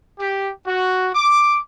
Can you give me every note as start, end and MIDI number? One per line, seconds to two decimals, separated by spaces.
0.19 0.50 67
0.66 1.09 66
1.15 1.57 86